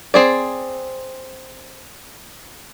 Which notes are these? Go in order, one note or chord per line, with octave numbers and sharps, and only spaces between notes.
C4 G#4 D5